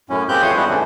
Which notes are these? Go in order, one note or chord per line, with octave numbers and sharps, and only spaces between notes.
F#2 A2 C#4
G#3 A#3 C4 G4 F#6 G6
F2 E3 C5 C#5 D#6
G3 G#3 B3 D4 E4 F#4
G#2 C#3 E3 A3